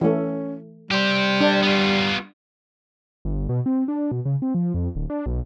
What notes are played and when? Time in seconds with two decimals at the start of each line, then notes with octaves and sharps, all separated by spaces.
0.01 E3 A3 C#4
0.91 G3 G4 C5
1.41 D4
1.63 B3 F4
3.25 G1
3.49 B2
3.66 C4
3.88 D4
4.12 B2
4.25 C#3
4.42 C4
4.55 F3
4.74 F2
4.95 D1
5.10 D4
5.26 B1